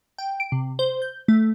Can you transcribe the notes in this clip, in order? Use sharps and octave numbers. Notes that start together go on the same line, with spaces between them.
G5
D7
C3
C5
G6
A3